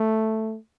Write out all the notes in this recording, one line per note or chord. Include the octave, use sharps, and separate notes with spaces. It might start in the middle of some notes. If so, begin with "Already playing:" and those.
Already playing: A3